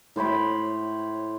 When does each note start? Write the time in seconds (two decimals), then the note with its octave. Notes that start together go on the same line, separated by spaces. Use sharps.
0.16 A2 C5 C#5 B5